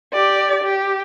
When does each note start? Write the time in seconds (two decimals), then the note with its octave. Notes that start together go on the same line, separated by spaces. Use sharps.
0.13 G4 D5
0.64 G4